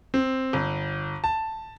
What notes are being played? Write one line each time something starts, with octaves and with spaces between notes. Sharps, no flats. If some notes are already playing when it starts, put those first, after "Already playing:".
C4
G1
A5